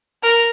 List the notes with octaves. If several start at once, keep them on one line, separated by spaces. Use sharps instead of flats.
A#4